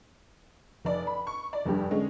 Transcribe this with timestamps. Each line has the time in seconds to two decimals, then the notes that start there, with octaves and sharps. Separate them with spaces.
0.85 F1 D5
1.07 B5
1.27 C#6
1.53 D5
1.65 F1 G2 G4
1.91 D3 G#3 C#4